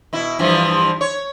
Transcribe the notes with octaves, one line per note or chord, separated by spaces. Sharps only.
B2 E4
G2 E3 F3
C#5